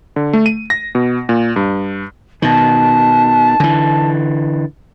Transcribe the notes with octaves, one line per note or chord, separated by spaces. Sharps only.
D3
A3
D#7
A#6
B2
A#2
G2
B2 D#3 A5
D3 E3